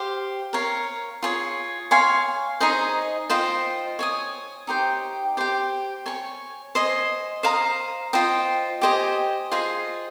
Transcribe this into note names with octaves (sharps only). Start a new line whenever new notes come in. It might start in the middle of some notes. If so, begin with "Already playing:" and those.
Already playing: G4 C5 F5
A#4 C#5 F5
F4 G#4 C#5
C#5 F5 G#5 C6
D#4 G#4 C5 D#5
F4 C5 D#5 G5
C#5 G#5 D#6
D#4 G4 C5 G5
G4 C5 G5
C#5 G#5 C#6
C5 D#5 G#5
C5 F5 A#5 D#6
F4 C5 D#5 G5
G4 C5 D#5 G#5
F4 G#4 C5 D#5